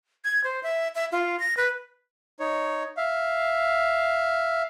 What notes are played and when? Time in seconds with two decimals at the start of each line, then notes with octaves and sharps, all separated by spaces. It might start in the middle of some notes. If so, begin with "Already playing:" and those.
0.24 G#6
0.44 C5
0.63 E5
0.95 E5
1.12 F4
1.40 A#6
1.57 B4
2.40 D#4 C#5
2.97 E5 F5